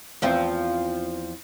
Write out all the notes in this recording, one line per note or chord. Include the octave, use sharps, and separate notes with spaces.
E2 F3 C4